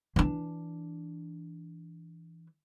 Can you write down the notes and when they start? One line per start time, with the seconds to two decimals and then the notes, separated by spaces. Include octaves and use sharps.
0.16 E3 D4